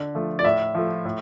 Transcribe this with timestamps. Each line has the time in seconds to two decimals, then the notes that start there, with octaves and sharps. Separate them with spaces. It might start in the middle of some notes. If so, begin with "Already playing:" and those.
Already playing: D3
0.15 F3 A3
0.39 D5
0.45 A2 E5
0.75 F3 A3
1.05 A2